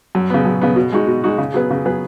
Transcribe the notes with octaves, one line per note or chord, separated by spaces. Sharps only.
F#2
C#3 B3
F#2
C#3 B3
B2
G#3 D#4 F#4
B2
G#3 D#4 F#4
C#3
F#3 B3 G#4 B4
C#3
F#3 B3 G#4 B4